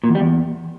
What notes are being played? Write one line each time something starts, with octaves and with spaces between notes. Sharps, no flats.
A#2
E2
G3
E2